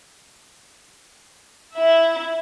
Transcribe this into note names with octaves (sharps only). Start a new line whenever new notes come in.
E4 E5